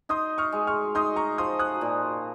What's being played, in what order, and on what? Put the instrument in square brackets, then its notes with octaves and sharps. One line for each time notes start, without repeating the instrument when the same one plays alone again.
[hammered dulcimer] D#4 [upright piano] C6 D#6
[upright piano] C#6 F6
[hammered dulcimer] G#3
[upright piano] C#6 F6
[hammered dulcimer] D#4 [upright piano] C6 D#6
[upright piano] A#5 C#6
[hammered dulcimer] F3 [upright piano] C6 D#6
[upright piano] D#6 F#6
[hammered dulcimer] A#2